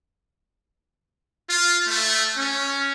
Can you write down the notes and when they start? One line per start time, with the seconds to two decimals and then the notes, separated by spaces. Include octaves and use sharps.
1.50 F4
1.88 A3
2.37 C#4